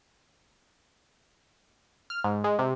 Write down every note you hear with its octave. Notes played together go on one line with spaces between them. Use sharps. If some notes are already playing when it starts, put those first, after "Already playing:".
F6
G#2
G#3
C3